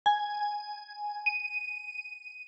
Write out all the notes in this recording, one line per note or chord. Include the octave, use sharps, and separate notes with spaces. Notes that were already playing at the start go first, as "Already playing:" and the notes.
G#5
D#7